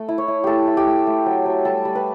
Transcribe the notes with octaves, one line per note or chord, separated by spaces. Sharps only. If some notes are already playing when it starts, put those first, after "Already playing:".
Already playing: A3
E4
C#5
E4
A3 G4 A4
E4
G4
A3
A3
F#3
F#3
G3 A4
G3
B4